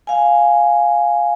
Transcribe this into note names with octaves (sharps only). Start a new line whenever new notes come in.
F5 G#5